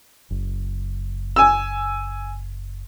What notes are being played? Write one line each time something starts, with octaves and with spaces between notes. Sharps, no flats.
F#1
G#5 E6